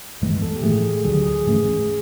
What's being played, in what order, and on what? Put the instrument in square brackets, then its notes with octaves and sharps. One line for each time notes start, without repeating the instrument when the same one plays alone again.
[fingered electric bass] G2 E3 G#3 B3
[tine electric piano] A4
G4
[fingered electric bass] A2 E3 A3 [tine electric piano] G#4
[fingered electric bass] D2 D3 F#3 [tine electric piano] G#4
[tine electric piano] G#4
[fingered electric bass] G#2 E3 A3 C#4 [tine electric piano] G#4